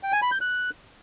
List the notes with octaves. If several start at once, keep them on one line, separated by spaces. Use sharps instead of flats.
G5
G#5
B5
G6
F#6